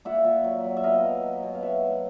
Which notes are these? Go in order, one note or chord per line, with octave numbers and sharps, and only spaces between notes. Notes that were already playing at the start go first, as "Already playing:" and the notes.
A#2 E5 F#5
A#2
F#3
F#3
E5
B2 D#5 F5
F#3
F#3
B2
F5
F#3 E5 F#5
A2